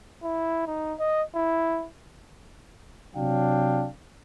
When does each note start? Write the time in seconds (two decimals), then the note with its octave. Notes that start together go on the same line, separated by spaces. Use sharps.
0.23 E4
0.67 D#4
0.99 D#5
1.35 E4
3.15 C3 F#3 D4 F5 G5